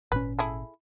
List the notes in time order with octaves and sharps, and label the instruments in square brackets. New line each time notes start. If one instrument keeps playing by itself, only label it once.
[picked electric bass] G#1 A#2 C#4 [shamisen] B4
[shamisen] E4 G#4 A4